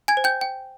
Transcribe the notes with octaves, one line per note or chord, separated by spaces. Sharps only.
G#5 G#6
C5
G5 G6
G5